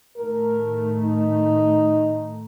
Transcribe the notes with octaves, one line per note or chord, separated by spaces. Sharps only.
A2 D#3 A3 A#4
D#4